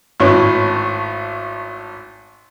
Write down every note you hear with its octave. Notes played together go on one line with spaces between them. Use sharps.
G#1 A2 C#4 B4